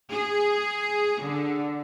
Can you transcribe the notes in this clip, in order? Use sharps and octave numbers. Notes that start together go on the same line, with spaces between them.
G#4
D3